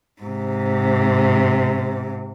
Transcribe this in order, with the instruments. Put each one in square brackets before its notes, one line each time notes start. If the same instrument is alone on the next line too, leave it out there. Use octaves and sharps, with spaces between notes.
[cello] G#2 C3